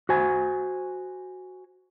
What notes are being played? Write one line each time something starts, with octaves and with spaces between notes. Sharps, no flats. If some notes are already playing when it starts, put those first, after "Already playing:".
F#4 C5 G#5